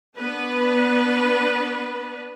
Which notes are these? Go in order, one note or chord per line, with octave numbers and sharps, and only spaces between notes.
B3 D4 B4